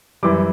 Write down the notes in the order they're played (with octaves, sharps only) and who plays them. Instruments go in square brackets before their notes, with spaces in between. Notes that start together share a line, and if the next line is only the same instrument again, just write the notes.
[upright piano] F#2 E3 G3 D6